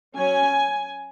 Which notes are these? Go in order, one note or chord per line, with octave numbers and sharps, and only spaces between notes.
F#3 C#4 G#5